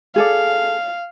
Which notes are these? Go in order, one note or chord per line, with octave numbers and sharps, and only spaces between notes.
G#4 A4 D5 F5